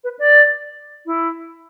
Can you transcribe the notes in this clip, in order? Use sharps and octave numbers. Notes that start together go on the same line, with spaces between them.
B4
D5
E4